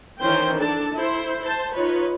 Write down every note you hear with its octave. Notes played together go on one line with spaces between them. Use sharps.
D#3 E3 C#4 C5 G5
D4 A4 A5
E4 C5
C5 A5
D#4 F4 B4 C#5